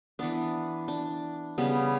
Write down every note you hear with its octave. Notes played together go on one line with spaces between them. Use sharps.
E3 B3 D4
D4
C#3 G3 B3